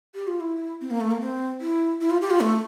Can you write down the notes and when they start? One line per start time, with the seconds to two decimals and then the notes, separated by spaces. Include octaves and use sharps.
0.15 G4
0.27 F4
0.40 E4
0.81 C4
0.91 A#3
1.01 A3
1.11 A#3
1.21 C4
1.61 E4
2.01 E4
2.11 F4
2.21 G4
2.30 F4
2.40 A3